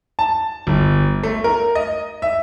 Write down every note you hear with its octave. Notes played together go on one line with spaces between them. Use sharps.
A5
G1
A3
A#4
D#5
E5